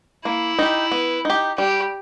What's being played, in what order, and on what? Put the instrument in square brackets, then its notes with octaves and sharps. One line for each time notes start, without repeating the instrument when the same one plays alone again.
[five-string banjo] A#3 [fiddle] E4
[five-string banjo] D#4 G4
B3
D#4 G4
[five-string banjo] G3 [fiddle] G4